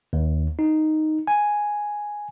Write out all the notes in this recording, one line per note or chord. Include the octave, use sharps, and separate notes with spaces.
D#2
D#4
G#5